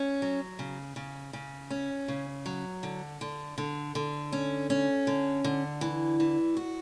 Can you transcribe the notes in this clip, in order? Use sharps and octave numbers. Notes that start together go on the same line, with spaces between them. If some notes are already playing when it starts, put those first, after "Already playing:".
Already playing: C#4
F#3
C#3
C#3
C#3
C#4
C#3
F#3
D3
D3
D3
D3
C#4
C#4
D3
D3
E3
E3
F#4